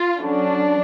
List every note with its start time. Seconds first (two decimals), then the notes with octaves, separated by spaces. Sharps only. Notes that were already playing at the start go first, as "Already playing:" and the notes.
Already playing: F4
0.20 D3 F#3 C#4 D4